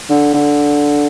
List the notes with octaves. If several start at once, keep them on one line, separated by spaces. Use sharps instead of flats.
D3
D3